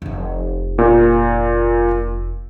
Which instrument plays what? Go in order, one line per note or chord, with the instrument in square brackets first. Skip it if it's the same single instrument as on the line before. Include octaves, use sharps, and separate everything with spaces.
[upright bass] F1 D#4
[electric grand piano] A#2